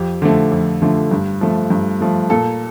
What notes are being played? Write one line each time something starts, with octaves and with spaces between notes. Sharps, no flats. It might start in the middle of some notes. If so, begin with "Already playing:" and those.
Already playing: F2 G4
D3 F3 A3
F2
D3 F3 A3
G2
F3 A3
G2
F3 A3
A#2 A4